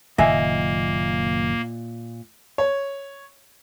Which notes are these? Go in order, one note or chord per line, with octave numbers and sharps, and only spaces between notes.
F#1 A#2 D#3 F#3 A#3 D#5 E5 G#5
C#5